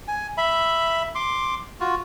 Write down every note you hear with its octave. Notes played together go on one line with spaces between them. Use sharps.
G#5
E5 B5
C6 D6
F4 F#4